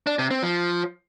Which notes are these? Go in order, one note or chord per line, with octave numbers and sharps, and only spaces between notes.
D4
C3
C4
F3